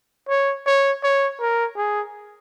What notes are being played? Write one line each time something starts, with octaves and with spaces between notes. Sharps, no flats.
C#5
C#5
C#5
A#4
G#4